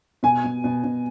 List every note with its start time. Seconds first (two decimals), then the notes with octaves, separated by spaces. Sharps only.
0.23 B2 G#5
0.44 B2
0.64 B2
0.84 B2